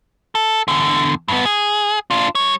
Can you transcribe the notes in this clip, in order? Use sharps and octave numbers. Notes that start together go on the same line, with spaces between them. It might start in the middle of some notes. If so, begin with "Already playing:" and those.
A4
E2 D3
G2 B3
G#4
D4 F4
G3 C#5